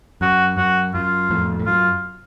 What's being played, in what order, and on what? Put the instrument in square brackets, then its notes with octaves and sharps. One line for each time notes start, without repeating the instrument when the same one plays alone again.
[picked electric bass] F#2 [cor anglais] F#4
[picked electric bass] F#2 [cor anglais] F#4
[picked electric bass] F#2 [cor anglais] F4
[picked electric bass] F2 A2
A2
[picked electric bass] F#2 [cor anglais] F4